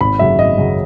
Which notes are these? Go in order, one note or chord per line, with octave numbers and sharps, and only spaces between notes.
G#1 B5
F#2 C#3 F#3 E5
G#1 D#5
F#2 C#3 F#3